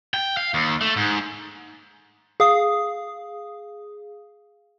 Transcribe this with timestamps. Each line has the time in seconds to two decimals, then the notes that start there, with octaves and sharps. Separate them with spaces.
0.14 G5
0.37 F5
0.54 D#2
0.81 A3
0.96 G#2
2.40 G#4 F5 D#6